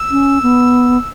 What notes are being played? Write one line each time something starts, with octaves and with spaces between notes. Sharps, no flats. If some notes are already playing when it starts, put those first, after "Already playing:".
Already playing: E6
C#4
B3